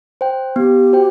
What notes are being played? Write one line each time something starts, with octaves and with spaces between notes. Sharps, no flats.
C5 G5
B3 G4
F#4 C5 G5